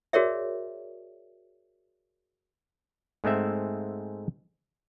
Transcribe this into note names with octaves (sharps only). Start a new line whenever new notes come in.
F#4 G#4 A#4 C#5 D5 E5
G#2 G#3 A3 C4 E5